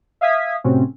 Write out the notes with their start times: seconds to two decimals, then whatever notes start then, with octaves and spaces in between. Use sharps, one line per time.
0.21 E5 F5 D#6 G#6 B6
0.64 A2 C3 C4 C#4 F#4